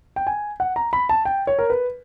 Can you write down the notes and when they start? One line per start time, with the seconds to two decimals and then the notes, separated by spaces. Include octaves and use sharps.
0.16 G5
0.27 G#5
0.60 F#5
0.76 A#5
0.93 B5
1.09 A5
1.25 G5
1.47 C#5
1.59 A#4
1.70 B4